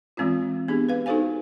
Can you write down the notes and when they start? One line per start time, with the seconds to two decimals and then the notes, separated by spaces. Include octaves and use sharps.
0.17 E3 G#3 C4 C#4 F4
0.68 B3 D4 G4 G#4
0.89 B4 F5
1.06 D#4 F#4 A4 C5 F5 G#5